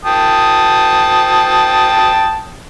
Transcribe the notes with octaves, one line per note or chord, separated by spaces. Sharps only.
G5 A5 D#6